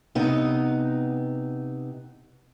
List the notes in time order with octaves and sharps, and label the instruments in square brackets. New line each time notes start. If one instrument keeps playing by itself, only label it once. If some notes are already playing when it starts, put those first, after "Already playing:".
[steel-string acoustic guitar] C3 B3 D#4